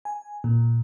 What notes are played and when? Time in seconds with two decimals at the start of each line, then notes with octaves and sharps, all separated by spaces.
0.05 G#5
0.44 A#2